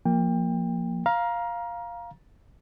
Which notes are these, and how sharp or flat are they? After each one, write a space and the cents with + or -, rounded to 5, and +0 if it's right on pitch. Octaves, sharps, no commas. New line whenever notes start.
F3 +0 A#3 +0 G5 +25
F5 +0 A#5 +20